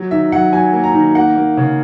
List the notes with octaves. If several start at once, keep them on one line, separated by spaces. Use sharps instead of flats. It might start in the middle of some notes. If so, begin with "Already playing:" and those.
Already playing: F#3
D#3 E5
F#3 F#5
F#3 G#5
A#3
A#5
D#3
A#3 F#5
A#3
C#3